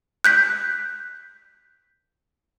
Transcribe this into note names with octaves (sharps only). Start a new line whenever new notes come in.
F#6 G6 B6